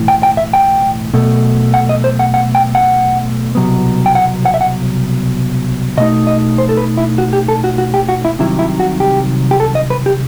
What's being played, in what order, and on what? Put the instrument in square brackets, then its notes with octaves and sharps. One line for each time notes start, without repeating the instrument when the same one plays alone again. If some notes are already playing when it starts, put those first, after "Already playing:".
Already playing: [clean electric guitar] B1 A2 E3
G5
G5
E5
G5
B1 B2 A3
F#5
D#5
C5
F#5
F#5
G5
F#5
C2 B2 F#3 B3
G5
F#5
F#5
E5
F#5
B2 A3 D#4 D#5
D#5
C5
A4
B4
E4
F#4
G4
A4
F#4
F#4
G4
F#4
E4
C2 C3 D#3 F#3 E4
E4
F#4
G4
G4
A4
D#5
B4
G4